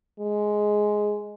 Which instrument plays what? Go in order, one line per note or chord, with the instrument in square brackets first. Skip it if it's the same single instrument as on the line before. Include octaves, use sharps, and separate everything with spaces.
[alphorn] G#3